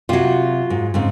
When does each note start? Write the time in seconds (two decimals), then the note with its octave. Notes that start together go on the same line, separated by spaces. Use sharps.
0.09 C3 F#3 F4 F#4
0.70 G#2
0.94 G#2 C#3 C4